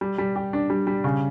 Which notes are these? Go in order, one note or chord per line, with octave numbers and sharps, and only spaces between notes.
G3
G3
G4
D4
G3
G3
C#3